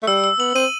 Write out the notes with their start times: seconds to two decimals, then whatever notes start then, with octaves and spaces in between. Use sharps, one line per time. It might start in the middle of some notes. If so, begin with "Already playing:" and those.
0.03 A3
0.07 G3 E6
0.24 E6
0.39 B3 F#7
0.55 C4 D#7